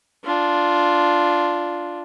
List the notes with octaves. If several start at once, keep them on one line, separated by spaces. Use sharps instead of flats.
D4 F4